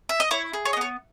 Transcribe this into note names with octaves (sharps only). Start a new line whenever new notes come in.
E5
D#5
E4 C#5
G#4
C#5
D#5
B3 C#5